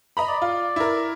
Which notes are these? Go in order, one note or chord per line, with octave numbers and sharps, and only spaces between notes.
D#5 A#5 B5
D5
F4
E4 A#4